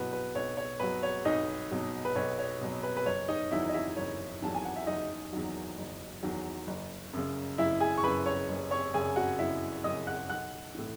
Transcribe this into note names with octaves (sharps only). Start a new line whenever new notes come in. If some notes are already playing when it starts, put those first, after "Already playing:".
Already playing: B2 F#3 E4 F#4 B4 F#5
B4
B1 C#5
C#5
B2 F#3 B4
C#5
B1 D#4 D#5
B2 F#3
B4
B1 C#5
C#5
B2 F#3
B4
B4
F#1 C#5
D#4 D#5
E2 D#3 F#3 E4 E5
D#5
E4 E5
F#1 C#5
E2 D#3 F#3 A5
G#5
F#5
E5
F#1 D#4 D#5
E2 D#3 F#3
F#1
E2 D#3 F#3
F#1
F#2 C#3
F#1 E4 E5
G#4 G#5
C#6
F#2 C#3 B4 B5
C#5 C#6
F#1
C#5 C#6
F#2 C#3 G#4 G#5
F#4 F#5
F#1 E4 E5
F#2 C#3 D#5 D#6
F#5 F#6
B1 F#5 F#6
A2 E3